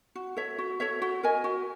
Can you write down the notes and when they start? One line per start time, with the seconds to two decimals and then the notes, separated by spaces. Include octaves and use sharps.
0.15 F#4
0.37 A4 C#5 E5
0.58 F#4
0.80 A4 C#5 E5
1.02 F#4
1.23 A#4 D#5 G#5
1.44 F#4